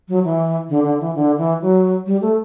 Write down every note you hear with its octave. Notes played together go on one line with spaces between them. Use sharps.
F#3
E3
D3
D3
E3
D3
E3
F#3
G3
A3